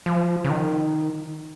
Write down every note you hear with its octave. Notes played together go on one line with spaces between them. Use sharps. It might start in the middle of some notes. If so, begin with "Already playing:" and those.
F3
C#3
D#3